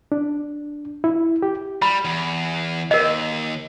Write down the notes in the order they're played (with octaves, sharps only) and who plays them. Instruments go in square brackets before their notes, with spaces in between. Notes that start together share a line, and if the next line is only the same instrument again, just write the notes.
[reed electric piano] D4
E4
G4
[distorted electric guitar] G3 [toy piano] B5
[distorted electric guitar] E2
[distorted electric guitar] D#2 [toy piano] A#4 D#5